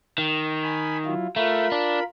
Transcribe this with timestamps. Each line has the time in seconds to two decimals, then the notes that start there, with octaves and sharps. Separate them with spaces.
0.18 D#3
0.62 G#5 B5
1.05 F#3 E4 F4
1.36 A3 F4 A#4 B5
1.72 D4